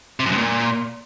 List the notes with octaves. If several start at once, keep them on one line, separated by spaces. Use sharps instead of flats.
C3
F#2
G2
A#2